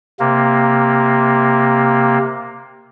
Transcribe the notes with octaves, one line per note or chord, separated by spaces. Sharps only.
C3 A#3